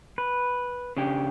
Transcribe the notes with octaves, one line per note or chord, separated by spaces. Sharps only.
B4
C#3 D4 G4